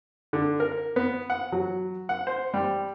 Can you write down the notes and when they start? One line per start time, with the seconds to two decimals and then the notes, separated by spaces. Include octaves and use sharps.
0.33 D3
0.60 A#4
0.96 B3
1.30 F#5
1.52 F#3
2.09 F#5
2.27 C5
2.54 G3